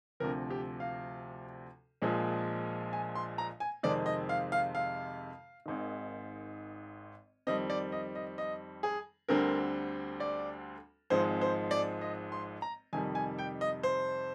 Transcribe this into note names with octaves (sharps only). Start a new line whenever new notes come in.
D2 C3 F3 A#4
G4
F5
A#1 A#2 F3 G#3
G#5
C6
A#5
G#5
F2 C3 D#3 G#3 C4 D5
D#5
F5
F5
F5
G#1 G#2 D#3
F2 D#3 G3 C4 D#5
D5
D#5
D#5
D#5
G#4
D2 D3 G3 C4 A#4
D5
G#1 G#2 F3 G#3 C4 C5
C5
D5
D#5
C6
A#5
F2 C3 D#3 G3 G#5
G#5
G5
D#5
C5